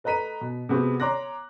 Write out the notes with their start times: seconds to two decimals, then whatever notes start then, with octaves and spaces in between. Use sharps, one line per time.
0.04 A3 B4 D#5 A#5 B6 D#7
0.41 B2
0.69 C3 G#3 B3 C4 F#4 G4
1.00 C#5 A#5 C6 D6 F#6 A#6